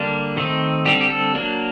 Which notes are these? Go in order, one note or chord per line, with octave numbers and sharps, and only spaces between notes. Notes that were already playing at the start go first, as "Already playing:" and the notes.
Already playing: D3 G3 A#3 D4
D#3 A3 C4 D#4
D3 G3 C4 G4
G4
A4
F#3 A#3 D4